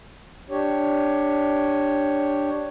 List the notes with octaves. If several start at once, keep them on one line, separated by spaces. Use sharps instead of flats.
D4 G4 C#5